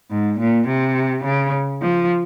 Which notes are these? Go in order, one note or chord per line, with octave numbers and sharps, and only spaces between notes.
G#2
A#2
C3
C#3
F3